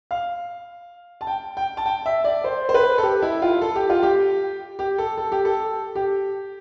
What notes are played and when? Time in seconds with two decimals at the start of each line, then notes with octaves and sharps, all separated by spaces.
0.11 F5
1.21 A5
1.27 G5
1.57 G5
1.77 A5
1.86 G5
2.06 E5
2.24 D5
2.44 C5
2.69 C5
2.74 B4
2.98 A4
3.03 G4
3.22 E4
3.42 F4
3.62 A4
3.76 G4
3.90 F4
4.03 G4
4.79 G4
4.98 A4
5.17 A4
5.32 G4
5.45 A4
5.95 G4